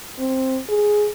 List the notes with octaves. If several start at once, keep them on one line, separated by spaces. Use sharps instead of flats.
C4
G#4